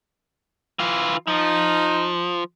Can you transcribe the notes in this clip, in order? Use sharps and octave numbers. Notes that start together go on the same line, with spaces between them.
E3 F4
F3 D#4